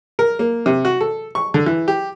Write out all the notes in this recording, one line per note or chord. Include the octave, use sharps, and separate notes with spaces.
A#4
A#3
C3
F#4
A4
C#6
D3
E3
G4